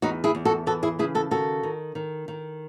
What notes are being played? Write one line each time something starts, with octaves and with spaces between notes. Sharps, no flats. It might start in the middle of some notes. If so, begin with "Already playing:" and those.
E2 D#4 F#4
E4 G#4
E2
F#4 A4
E3 F#4 A4
E4 G#4
C#3 E4 G#4
F#4 A4
D#3 F#4 A4
D#3
D#3
D#3